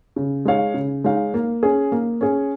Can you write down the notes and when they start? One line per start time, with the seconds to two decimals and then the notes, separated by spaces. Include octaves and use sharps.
0.16 C#3
0.45 G#3 D#4 C#5 F5
0.74 C#3
1.04 G#3 D#4 C#5 F5
1.34 A#3
1.63 C#4 G#4
1.92 A#3
2.21 C#4 G#4